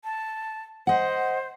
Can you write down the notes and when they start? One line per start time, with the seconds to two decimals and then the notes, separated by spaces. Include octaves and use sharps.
0.04 A5
0.87 C5 D#5 F#5